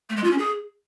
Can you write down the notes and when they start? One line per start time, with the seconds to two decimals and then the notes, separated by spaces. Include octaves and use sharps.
0.09 A3
0.17 G#3
0.24 F4
0.31 C#4
0.38 G#4